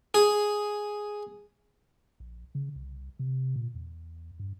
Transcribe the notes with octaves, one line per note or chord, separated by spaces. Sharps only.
G#4
A#1
C#3
C2
C3
A#2
E2
G2